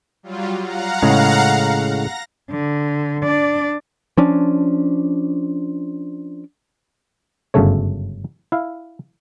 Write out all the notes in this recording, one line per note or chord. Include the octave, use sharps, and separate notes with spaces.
F#3 G3 F4
F5 F#5 A#5
A2 C#3 G#3
A#6
D3
D4 D5
F3 C#4 D4
G1 F#2 C#3 A3 C#5
E4 F5